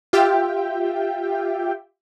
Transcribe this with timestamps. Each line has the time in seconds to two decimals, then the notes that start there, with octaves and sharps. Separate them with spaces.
0.13 F4 G4 E5 G5